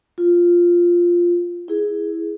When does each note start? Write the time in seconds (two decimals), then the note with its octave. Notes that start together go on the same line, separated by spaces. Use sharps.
0.18 F4
1.68 E4 G#4